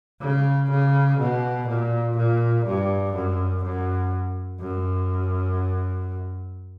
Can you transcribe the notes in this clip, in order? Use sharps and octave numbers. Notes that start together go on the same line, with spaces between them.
C#3
C#3
B2
A#2
A#2
G2
F#2
F#2
F#2